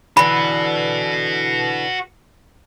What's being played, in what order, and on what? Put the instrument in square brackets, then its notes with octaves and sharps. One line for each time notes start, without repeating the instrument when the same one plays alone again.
[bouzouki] D3 E3 [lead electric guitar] F#4 B4 [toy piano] B5